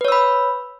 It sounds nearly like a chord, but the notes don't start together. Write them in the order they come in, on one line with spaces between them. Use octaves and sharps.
B4 C#5 E6 B5